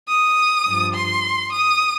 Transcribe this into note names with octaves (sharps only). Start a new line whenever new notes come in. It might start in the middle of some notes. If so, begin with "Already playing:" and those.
D#6
G2 F3
C6
D#6